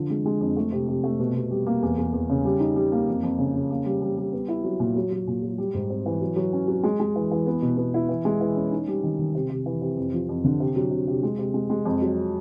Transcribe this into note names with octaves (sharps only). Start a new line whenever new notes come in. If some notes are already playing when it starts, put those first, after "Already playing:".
Already playing: D3 F3
G#3
G#3
F2
A3
C3
C3
A3
B2
B2
G3
A#3
E2
E2
E2
C#3
G3
D#4
G3
A#3
F2
F2
C#3
C#3
A#3
G3
G3
G3
B3
E4
F#3
A#2
F#3
F#3
A#2
F#3
G3
G#2
C4
E3
F#3
F#3
C#4
F#3
G#3
G#3
E3
E3
B3
B2
B3
E4
E3
G#3
E3
C#4
D#4
G3
D#3
D#3
C3
C3
E3
C3
F2
F3
F2
D3
C3
F#3
C3
C3
G#3
C3
G#3
G#3
F2
F#3